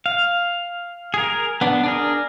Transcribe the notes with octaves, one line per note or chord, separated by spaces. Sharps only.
F5
G#4 A#4
B3 D4
D4 G#4 A#4